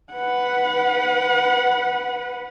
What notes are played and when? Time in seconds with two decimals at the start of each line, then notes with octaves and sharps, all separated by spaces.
0.13 B4 F#5